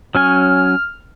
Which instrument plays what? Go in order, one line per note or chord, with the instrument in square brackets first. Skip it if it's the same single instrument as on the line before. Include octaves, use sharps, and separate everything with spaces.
[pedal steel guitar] F#3 C#4 G#5 [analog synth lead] F6